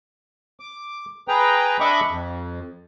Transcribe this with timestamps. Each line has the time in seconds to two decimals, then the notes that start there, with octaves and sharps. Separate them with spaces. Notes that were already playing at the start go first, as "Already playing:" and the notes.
0.60 D6
1.28 G#4 B4 G5 A#5
1.80 D4 D#5 E5 B5 C#6 D6
2.10 F2